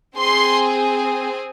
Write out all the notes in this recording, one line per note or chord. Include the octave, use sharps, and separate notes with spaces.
C4 G#4 C6